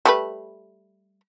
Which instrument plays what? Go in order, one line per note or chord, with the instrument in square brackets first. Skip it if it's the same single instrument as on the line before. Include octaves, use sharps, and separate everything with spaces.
[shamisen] G3 A3 B4